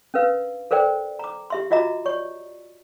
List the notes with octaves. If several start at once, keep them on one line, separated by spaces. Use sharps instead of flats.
C#4 D4 A#4 B4 F5
A4 A#4 C5 D5 G5
A#5 D6
G4 E5 C6
F4 F#4 D#5 E5 A#5 D6
C#5 D5 C#6